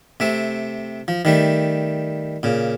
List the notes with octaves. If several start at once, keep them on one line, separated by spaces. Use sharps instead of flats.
C3 A3 C4
F3
D#3 G3 A3
A#2 C#3